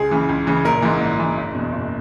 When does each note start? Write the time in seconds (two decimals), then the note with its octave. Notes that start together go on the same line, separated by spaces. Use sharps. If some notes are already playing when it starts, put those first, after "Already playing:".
Already playing: C#2 G#4
0.11 C#3 E3
0.29 C#2
0.47 C#3 E3
0.64 A#1 A#4
0.82 G#2 E3
1.01 A#1
1.19 G#2 E3
1.37 F#1
1.55 E2 B2
1.72 F#1